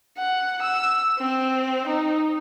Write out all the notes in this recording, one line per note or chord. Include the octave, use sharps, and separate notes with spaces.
F#5
E6
C4
D#4